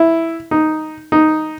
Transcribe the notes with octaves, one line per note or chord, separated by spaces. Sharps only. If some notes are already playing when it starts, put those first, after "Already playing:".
Already playing: E4
D#4
D#4